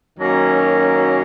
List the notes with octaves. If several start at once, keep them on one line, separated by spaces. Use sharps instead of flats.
F#2 D#3 F#3 A#3 C#4